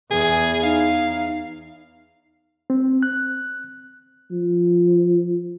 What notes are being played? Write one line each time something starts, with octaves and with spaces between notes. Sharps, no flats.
E2 G#4
D#4 F5
C4
F#6
F3